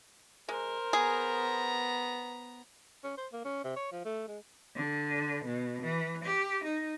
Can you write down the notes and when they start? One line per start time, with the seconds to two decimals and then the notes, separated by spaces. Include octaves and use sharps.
0.49 G#3 A#4 C5
0.93 B3 G#4 A#5
3.04 C#4
3.18 C5
3.33 A#3
3.45 C#4
3.64 C3
3.76 C#5
3.92 F3
4.05 A3
4.28 G#3
4.75 D3
5.44 B2
5.82 E3
6.24 G4
6.64 D#4